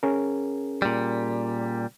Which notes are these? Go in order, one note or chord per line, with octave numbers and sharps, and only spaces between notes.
C#4 G#4 A#4
A#2 G3